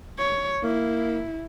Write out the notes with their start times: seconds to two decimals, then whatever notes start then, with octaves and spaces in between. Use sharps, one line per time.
0.18 C#5
0.64 A#3 E4